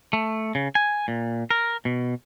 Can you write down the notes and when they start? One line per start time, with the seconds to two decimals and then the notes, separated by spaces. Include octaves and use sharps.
0.13 A3
0.55 C#3
0.75 G#5
1.08 A#2
1.51 A#4
1.85 B2